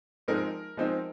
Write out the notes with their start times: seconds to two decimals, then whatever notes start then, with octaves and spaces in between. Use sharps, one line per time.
0.28 F3 G#3 C4 D#4 A#4
0.77 F3 G#3 C4 D#4